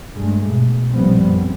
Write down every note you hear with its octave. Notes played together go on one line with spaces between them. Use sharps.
G2 G#3 A3
B2
A#1 G2 F3 G3 B3 C4
F#2